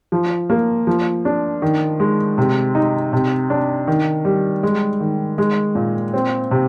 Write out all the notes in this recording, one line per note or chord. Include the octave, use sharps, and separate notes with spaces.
F3
A#3
F3
D4
D#3
G#3
C3
D#4
C3
D4
D#3
G3
G#3
D#3
G#3
A#2
C4
C3